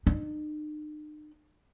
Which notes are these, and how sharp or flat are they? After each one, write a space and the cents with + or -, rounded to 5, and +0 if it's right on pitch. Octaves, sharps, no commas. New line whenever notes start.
D#4 -45